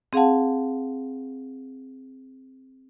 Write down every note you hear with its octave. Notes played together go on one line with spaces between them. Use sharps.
C4 G#4 F5 F#5 A5